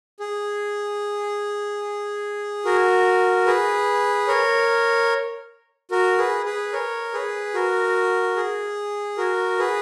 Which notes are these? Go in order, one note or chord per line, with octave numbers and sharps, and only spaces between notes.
G#4
F#4 A#4
G#4 B4
A#4 C#5
F#4 A#4
G#4 B4
G#4 B4
A#4 C#5
G#4 B4
F#4 A#4
G#4
F#4 A#4
G#4 B4